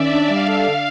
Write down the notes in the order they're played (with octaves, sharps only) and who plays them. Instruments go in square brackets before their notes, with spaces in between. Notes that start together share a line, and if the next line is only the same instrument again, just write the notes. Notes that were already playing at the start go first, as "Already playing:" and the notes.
Already playing: [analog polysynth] D#3 C#4 [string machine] D5 E5
[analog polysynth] D4
[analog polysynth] G3 [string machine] F5
[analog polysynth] A4
D3